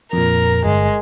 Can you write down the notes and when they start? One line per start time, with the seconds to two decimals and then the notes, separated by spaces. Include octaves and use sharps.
0.13 F2 A#2 A#4
0.66 G1 G#3